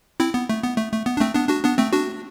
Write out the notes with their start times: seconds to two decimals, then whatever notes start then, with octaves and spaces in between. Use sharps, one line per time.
0.20 C4 E4
0.34 B3
0.49 A3
0.63 B3
0.78 A3
0.92 A3
1.06 B3
1.17 D4
1.21 A3 C4
1.35 B3 D4
1.49 D4 F#4
1.64 B3 D4
1.78 A3 C4
1.93 D4 F#4